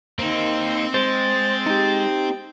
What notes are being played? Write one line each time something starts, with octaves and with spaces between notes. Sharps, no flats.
A#3 C4 D#4
G#3 C5 A6
D#4 G4